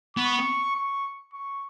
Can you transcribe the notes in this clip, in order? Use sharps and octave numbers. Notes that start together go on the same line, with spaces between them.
B3 C#6
C#6
C#6